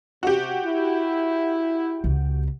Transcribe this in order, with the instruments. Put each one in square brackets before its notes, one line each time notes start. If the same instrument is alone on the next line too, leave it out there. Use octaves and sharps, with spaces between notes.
[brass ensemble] C3 [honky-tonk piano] F#4 G4
[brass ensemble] E4
[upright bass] C#2